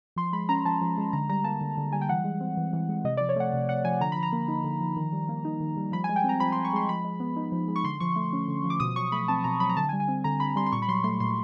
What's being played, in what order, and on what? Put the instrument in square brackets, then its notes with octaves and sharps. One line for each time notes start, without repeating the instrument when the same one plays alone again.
[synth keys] F3 C6
G#3 B5
C#4 A#5
F3 A5
F3
G#3
D3 A#5
G3 A#5
A#3 A5
D3
D3
G3 G#5
G5
E3 F#5
G#3
C4
E3
E3
G#3
C3 D#5
F3 D5
C#5
A3 F#5
C3
C3 F#5
F3 G#5
D3 A#5
F3 B5
A#5
A#3
D#4
D3
F3
D#3
G3
A#3
D#4
D#3
G3
F3 B5
G#5
G#3
G5
C4
A#5
F3 B5
C6
F3
C#6
G#3 C6
F3 B5
G#3
B3
D#4
F3
G#3
C#6
D3 C6
F3 C#6
A3
C#4
D3
F3
D6
B2 D#6
F#3 C#6
A3 B5
C4 A5
B2 A#5
F#3 B5
A#5
D3 A5
G#5
G3
G#5
C4
D3 A#5
D3 B5
G3 C6
C6
A#2 C#6
B5
F#3 C6
A3 C6
A#2 C6